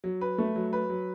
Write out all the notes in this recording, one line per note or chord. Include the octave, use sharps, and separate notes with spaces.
F#3
B4
A3
F#3
B4
F#3